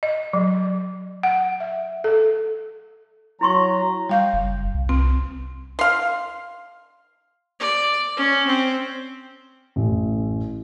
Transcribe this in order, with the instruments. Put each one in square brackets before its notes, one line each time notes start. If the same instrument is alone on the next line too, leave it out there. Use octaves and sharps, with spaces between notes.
[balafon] D#5
F#3
F#5
E5
A4
[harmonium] F#3 A#5 [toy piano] E4 C6 C#6
[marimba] G3 F5 G6
[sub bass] F#1
C2
[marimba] C4
[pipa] F5 C6
[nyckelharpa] D5
C#4
C4
[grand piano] A1